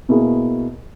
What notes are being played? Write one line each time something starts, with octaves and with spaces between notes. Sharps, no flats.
B2 A#3 E4 G#4